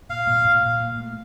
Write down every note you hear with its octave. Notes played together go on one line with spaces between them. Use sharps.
A#2 F5
A#2
A#2
A#2
A#2
A3